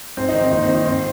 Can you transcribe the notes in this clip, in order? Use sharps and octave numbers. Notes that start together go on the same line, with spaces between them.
G#2 C4
D#4
D#3
C4
D#2 D#4
C4
D#3
D#4
G#2 C4